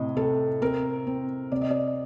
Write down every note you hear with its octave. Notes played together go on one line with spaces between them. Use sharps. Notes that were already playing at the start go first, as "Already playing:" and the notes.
Already playing: A2 C3 D#5
C3 A4
C4 A#4
C4
C3 D5
D#5
D5